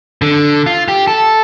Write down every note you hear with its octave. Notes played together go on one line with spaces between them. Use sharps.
D3
F4
G4
A4